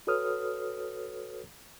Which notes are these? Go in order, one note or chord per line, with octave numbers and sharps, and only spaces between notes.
F#4 A4 B4 C#5 D#6 F6